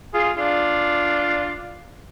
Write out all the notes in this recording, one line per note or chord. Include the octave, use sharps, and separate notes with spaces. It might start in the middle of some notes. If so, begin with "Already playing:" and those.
F4 G#4
D4 F4